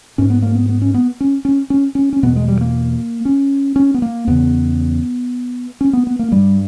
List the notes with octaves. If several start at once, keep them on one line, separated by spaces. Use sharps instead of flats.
G#2 C#4
B3
A#3
B3
B3
C#4
B3
C#4
C#4
C#4
C#4
C#4
E2 B2 B3
G#3
G3
A#3
C#4
C#4
B3
A#3
E2 C#3 B3
C#4
B3
B3
A#3
G2 G3